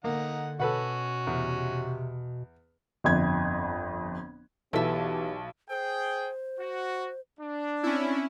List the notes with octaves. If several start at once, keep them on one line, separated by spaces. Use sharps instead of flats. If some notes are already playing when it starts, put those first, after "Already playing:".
D3 A#3 D#4 F#5
B2 C#4 F#4 A4 B4 F#5
E2 C3
G1 F2 G#6
B1 E3 B3 E4 G4 A4 E5 A5
G#4 C5 G5
F#4
D4
C4 C#4 E4